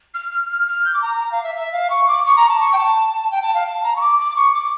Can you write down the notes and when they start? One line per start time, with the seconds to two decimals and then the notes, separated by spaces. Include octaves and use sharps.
0.14 F6
0.32 F6
0.50 F6
0.67 F6
0.85 G6
0.94 D6
1.02 A#5
1.20 A#5
1.32 F5
1.43 E5
1.55 E5
1.72 F5
1.90 C#6
2.08 D6
2.26 C#6
2.36 A#5
2.49 A5
2.61 C#6
2.73 G5
2.77 A5
3.31 G5
3.42 A5
3.54 F5
3.66 A5
3.84 A#5
3.96 C#6
4.01 D6
4.19 D6
4.36 C#6
4.54 D6